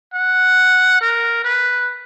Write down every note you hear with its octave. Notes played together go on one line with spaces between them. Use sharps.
F#5
A#4
B4